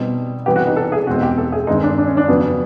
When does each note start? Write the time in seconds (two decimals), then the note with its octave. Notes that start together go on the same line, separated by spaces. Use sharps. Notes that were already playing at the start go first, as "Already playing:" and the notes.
Already playing: B2 G3 C4 D#4
0.46 C3 E3 G3 B3 G4
0.56 F#4
0.67 D#4
0.76 A4
0.92 G#4
1.07 E2 B2 G#3 C4 D#4 F#4
1.22 G4
1.38 A4
1.52 G#4
1.67 G2 D#3 G#3 C4 D#4
1.83 D4
1.98 D4
2.07 C#4
2.17 D4
2.28 F2 C#3 F#3 B3